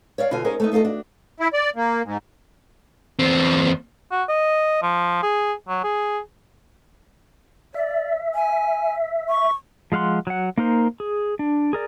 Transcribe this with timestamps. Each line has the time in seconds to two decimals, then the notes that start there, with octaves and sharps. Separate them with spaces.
0.18 C#5 D5 E5 F5
0.31 B2 D3 F4 F#4 G#5
0.44 C#4 D#4 G#4 A#4 C5
0.60 A3 B3 D#4
0.72 D#4 F4 F#4 A4 D#5
0.84 D4 F#4
1.40 E4
1.53 D5
1.76 A#3
2.05 G#2
3.19 E2 C4
4.12 F#4
4.29 D#5
4.83 F3
5.23 G#4
5.69 F#3
5.84 G#4
7.74 D5 E5
8.34 G#5
9.29 C#6
9.92 F3 G#3 F5 F#5 C6
10.27 F#3 F#5
10.58 A#3 D#4 A#4 C5
11.00 G#4
11.39 D4
11.73 G#4 A#4 D5